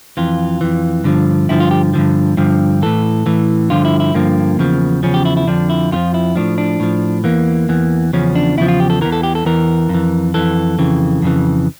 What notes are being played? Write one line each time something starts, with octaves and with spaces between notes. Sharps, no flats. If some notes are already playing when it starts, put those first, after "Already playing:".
F2 E3 F4
F2 E3
G2 D3 F3
G2 D3 F3 E4
F4
G4
G2 D3 F3
G2 D3 F3
A2 E3 A4
A2 E3
G2 D3 F3 F4
E4
E4
G2 D3 F3 A#3
E2 C#3 F3
E2 C#3 F3 C#4
G4
E4
E4
F2 D3 F3 D4
E4
F2 D3 F3 F4
E4
A2 F3 D4
D4
A2 F3
E2 E3 A#3
E2 E3
E2 C#3 F3 C#4
D4
E2 C#3 F3 E4
F4
G4
A4
E2 E3 A#4
A4
G4
A4
E2 E3 A#4
F2
E3
F2 E3 A4
F2 C#3 E3
F2 C#3 E3